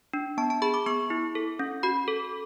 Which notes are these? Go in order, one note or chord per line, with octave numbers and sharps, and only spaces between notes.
D4
B3 A5
A5
G#4 B5
D6
B3 C#6
E4
A4
C#4
F#4 B5
A4